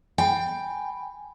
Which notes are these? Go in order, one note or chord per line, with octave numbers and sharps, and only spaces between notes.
G5 G#5 B5